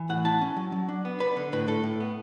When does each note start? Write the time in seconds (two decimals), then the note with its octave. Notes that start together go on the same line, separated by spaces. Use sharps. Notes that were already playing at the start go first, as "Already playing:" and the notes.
Already playing: E3
0.09 A2 F#5
0.25 E4 A5
0.41 C#4
0.56 F#3
0.72 F#3
0.88 D4
1.05 B3
1.20 D4 B4
1.37 D3
1.53 A2 B4
1.68 A2 A4
1.83 A2
2.00 B3